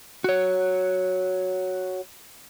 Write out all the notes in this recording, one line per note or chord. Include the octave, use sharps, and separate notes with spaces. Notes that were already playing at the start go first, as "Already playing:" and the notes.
F#4 C#5